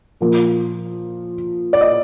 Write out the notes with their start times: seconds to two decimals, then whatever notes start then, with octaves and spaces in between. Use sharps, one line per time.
0.21 A#2 F3 A#3
1.73 D5
1.81 D#5